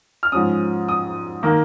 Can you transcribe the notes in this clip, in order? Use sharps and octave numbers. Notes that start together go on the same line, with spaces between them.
F6
G#2 F3 C#4 D#6
D#6
D#3 A#3